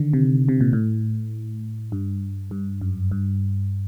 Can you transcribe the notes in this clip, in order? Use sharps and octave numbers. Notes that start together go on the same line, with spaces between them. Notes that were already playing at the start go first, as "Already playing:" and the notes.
Already playing: D3 D#3
C3
C3
A#2
A2
G2
G2
F#2
G2